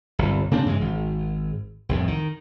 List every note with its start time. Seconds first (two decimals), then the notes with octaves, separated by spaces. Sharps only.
0.19 G1 C2
0.51 C#3 A#3 C4 D4
0.65 G2 C#3 E3 G#3
0.81 G#1
1.89 C2 F2 A2
2.07 D#3